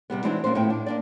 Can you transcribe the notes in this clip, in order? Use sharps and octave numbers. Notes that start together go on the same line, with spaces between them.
G2 C3 G3 B3
E3 G#3 C4 D4 D#4 F#4
G3 A#3 B3 C#4 C5
F2 A2 B3 E4 G5
D4
A#3 D4 D5